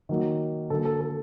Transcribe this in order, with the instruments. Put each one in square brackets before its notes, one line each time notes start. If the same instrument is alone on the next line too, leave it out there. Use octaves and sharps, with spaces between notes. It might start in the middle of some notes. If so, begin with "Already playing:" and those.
[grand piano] D#3 F#3 A#3
D3 F#3 A#3 A4
A4
A4